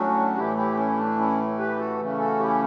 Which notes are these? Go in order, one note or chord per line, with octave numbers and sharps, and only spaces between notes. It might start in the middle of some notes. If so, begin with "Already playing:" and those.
Already playing: A2 F#3 A3 C#4 D4 F#4
A2 E3 A3 E4 G4
E4 G4
C#4 E4
D4
C#4 E4
G4 B4
F#4 A4
C#3 E3 A3 C#4
F#4 A4
E4 G4